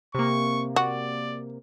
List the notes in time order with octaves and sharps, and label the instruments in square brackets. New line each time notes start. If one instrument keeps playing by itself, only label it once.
[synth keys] C3 A#3 [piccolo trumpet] C#6
[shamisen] F#4 [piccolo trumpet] D5